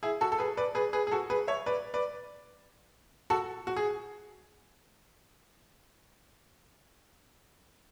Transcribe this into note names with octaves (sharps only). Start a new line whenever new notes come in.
E4 G#4
F#4 A4
A4
G#4 B4
B4 D5
G#4 B4
G#4 B4
G#4
F#4 A4
G#4 B4
C#5 E5
B4 D5
B4 D5
F#4 A4
F#4
G#4